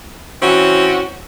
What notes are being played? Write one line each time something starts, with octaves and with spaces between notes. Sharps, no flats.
E3 C4 C#4 F#4